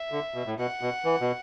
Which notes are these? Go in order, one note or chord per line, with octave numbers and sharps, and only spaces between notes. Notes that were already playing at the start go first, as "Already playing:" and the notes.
Already playing: E5
D3
B2
A2
B2 F#5
B2
E3
B2